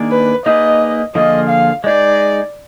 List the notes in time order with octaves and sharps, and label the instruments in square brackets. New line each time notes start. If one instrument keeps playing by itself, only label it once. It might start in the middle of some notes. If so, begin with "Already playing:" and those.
Already playing: [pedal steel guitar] D#3 A#3 D4 G#4 D5
[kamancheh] B4
[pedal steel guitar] A#3 D#4 G#4 B4 D5 [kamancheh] D#5
[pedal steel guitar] D3 F3 A#3 F4 G#4 [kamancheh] D#5
[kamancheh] F5
[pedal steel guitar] G#3 D#4 G#4 [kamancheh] D5